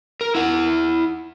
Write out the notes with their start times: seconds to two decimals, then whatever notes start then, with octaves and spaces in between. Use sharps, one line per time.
0.21 A#4
0.35 E4 F#5